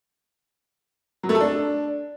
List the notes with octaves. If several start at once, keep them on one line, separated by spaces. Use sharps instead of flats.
F#3
A3
A4
D4